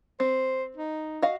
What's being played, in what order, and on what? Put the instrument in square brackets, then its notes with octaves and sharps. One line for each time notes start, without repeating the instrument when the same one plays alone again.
[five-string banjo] C4 [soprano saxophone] C5
[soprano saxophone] D#4
[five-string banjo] F#4 D#5 F5